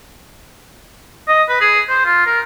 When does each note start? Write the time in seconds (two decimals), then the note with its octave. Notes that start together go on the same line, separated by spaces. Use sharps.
1.28 D#5
1.49 B4
1.61 G#4
1.89 C5
2.05 F4
2.26 A#4